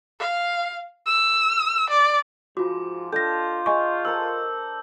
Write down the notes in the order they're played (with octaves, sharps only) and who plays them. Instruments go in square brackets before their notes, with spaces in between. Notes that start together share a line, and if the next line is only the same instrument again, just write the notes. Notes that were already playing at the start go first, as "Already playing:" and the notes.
[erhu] F5
E6
D5
[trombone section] G#2 F3 [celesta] F4 F#4 [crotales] D6
[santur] D4 D#5 G5 [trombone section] F4 [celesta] A4 A#6 [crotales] G6
[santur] G#4 G#5 B5 [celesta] D#5 C#6
[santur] A4 A#4 C5 [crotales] E6 G6